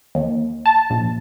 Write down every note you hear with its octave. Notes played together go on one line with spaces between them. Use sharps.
D#2
A5
A#1